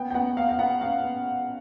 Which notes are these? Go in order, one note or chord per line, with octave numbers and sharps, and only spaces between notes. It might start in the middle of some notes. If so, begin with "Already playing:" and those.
Already playing: B3 G5
G5
B3 F#5
B3 F5
F5
B3 F#5
B3 F5
B3